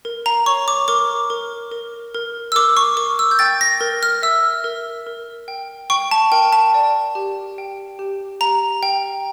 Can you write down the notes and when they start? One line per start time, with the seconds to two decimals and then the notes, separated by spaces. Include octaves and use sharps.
0.05 A#4
0.26 A#5
0.46 C#5 C#6
0.68 D6
0.88 A#4 D6
1.30 A#4
1.72 A#4
2.14 A#4
2.52 E6
2.55 A#4 D6
2.77 C#6
2.97 A#4 D6
3.19 E6
3.31 G6
3.39 G5 A6
3.61 A#6
3.81 A#4
4.03 F6
4.22 E5 E6
4.64 A#4
5.07 A#4
5.48 G5
5.90 G5 C#6
6.11 A5
6.32 A#4 G5
6.53 A5
6.74 D5
7.15 G4
7.58 G5
7.99 G4
8.41 G4 A#5
8.83 G5